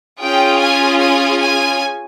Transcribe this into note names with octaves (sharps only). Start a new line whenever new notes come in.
C#4 F4 G#4 G5
G#5
G#5
G#5